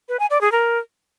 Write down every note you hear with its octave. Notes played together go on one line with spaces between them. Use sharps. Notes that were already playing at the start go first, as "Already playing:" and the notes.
B4
G#5
D5
G#4
A#4